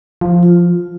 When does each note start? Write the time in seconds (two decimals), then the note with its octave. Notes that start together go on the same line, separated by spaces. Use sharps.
0.21 F3
0.43 F4